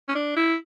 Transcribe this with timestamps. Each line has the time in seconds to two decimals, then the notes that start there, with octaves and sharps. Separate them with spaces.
0.09 C#4
0.15 D4
0.36 E4